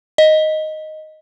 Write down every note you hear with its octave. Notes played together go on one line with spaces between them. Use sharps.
D#5